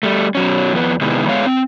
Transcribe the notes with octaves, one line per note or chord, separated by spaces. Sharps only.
G3 A3
B2 F#3 C#4
F2 B3
C3 D#3 G#3 B3 E4
G#3 A3 B3 C#5 F5
C4